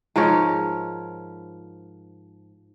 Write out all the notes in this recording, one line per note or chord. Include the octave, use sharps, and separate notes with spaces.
G#2 F3 A#4 C#5